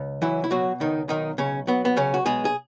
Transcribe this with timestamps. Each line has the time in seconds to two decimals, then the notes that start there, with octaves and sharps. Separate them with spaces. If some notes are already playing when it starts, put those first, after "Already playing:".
Already playing: C#2
0.22 E3 F#3 E4
0.44 E4
0.51 B2 F#3 F#4
0.80 C#2 D#3 D#4
1.09 B1 D#3 D#4
1.38 B1 C#3 C#4
1.67 F#3 B3
1.85 B3
1.97 B1 C#3 C#4
2.14 F#4
2.26 B2 G#3 G#4
2.45 G#4